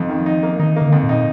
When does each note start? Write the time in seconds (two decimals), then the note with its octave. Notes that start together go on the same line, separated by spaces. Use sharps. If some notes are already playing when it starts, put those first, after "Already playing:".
Already playing: F2 F3 D#4
0.09 D#3
0.26 D#4
0.43 A#3
0.59 D#3 D#4
0.76 A#3
0.82 D3
0.92 F2
1.03 A#2
1.09 D#4